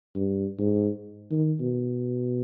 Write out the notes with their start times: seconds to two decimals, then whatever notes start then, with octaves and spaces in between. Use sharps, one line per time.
0.16 G2
0.59 G#2
1.31 D#3
1.61 B2